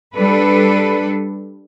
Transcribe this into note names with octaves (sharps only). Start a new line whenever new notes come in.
G3 D4 A4 B4